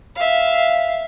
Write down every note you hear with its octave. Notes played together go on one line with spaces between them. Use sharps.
E5 F5